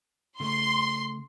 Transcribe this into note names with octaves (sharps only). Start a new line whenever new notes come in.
C#3 A3 C6